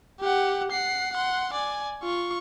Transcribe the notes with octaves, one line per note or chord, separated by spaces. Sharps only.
G4 F#5
F#5 C7
F#5 C6
D5 G#5
F4 C#6